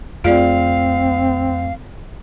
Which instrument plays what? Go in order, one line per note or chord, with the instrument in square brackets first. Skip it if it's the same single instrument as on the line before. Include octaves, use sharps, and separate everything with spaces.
[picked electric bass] F2 A3 [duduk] C4 [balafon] F4 G#4 D5 [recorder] F5